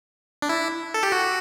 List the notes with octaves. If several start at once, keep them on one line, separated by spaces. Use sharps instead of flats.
D4
E4
A4
G4
F#4